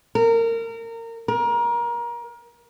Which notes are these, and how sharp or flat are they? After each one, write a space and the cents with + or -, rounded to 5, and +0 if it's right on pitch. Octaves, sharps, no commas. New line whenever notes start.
A#4 -25
A#4 +30